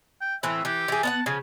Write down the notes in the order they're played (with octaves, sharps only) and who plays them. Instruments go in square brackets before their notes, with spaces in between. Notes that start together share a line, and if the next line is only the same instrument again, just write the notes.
[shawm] G5
[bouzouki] A2 E3 C4 [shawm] E5
[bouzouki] E3 [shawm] G4
[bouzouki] E3 G#4
[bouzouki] B3 F5 F#5 [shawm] A5
[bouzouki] C#3 F3 [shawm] G#5